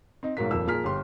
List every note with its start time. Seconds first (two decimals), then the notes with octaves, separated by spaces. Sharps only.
0.23 C4 D#4
0.37 B1 G#2 F#3 A#3 B6
0.51 D#1 F2 A#3 E6
0.67 A#2 F3 G#4 A#4 F6 B6
0.84 G1 G4 C6